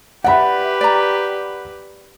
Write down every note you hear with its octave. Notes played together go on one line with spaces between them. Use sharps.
G4 B4 D5 E5 F#5 B5
D5 A#5